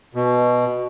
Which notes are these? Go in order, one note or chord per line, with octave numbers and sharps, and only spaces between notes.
B2